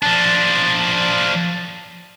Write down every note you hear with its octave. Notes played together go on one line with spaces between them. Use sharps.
F3 D4 A5